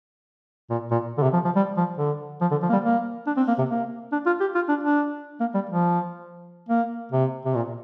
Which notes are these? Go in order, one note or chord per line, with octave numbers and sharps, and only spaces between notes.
A#2
A#2
D3
C3
F3
F3
G3
F3
D3
F3
D3
F3
A#3
G3
A#3
D4
C4
A#3
C3
A#3
D4
F4
G4
F4
D4
D4
A#3
G3
F3
A#3
C3
C3
A#2